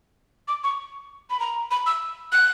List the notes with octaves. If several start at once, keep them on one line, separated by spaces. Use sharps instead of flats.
D6
C#6
B5
A#5
B5
E6
F#6